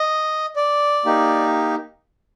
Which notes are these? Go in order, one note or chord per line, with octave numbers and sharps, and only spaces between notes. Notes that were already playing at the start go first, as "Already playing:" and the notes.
Already playing: D#5
D5
A#3 D#4 G4